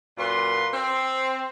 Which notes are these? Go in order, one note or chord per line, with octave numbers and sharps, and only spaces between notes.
F#2 A#2 B4 C6
C4